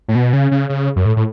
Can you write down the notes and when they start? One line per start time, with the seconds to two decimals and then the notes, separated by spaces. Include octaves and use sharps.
0.08 A2
0.15 B2
0.33 C#3
0.51 C#3
0.69 C#3
0.96 F#2
1.05 A2
1.16 A2